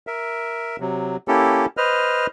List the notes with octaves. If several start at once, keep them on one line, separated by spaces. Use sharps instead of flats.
A#4 E5
C3 F#3
A#3 C#4 E4 G4 A4
B4 C5 D#5 F6